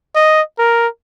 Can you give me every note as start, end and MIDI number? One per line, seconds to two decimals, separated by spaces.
0.15 0.41 75
0.59 0.87 70